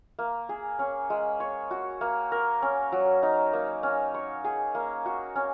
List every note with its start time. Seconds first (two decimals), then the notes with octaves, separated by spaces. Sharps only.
0.19 A#3
0.49 G#4
0.79 C#4
1.10 G#3
1.40 C#5
1.71 F#4
2.01 A#3
2.32 A#4
2.62 C#4
2.92 F#3
3.23 D#4
3.53 A#3
3.83 C#4
4.14 C#5
4.44 G#4
4.75 A#3
5.06 F#4
5.35 C#4